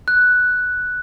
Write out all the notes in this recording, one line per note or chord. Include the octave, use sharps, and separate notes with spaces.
F#6